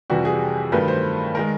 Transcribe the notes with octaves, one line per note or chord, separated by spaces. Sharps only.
F2 C3 E3 G3 F#4
G#4
G2 D#3 F#3 A3 B4
C5
D#3 G#3 A#4